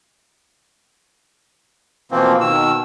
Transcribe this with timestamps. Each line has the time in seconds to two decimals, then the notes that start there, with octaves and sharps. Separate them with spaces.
2.11 B2 E3 F3 A#3 C4
2.41 B2 D#3 E6